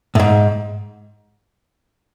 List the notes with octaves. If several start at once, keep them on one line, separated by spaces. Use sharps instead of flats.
A2
G#2